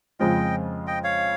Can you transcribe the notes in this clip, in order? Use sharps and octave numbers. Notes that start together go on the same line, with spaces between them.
F2 C#3 G#3 C4 F4 D#5 G5
D#5 G5
C#5 F5